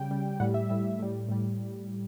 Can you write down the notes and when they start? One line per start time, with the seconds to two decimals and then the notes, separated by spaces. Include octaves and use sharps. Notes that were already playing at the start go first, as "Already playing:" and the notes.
Already playing: C#3 G3 G5
0.11 C#3 G3
0.40 A2 G3 F#5
0.54 E5
0.69 A2 G3 E5
0.99 A2 G3
1.29 A2 G3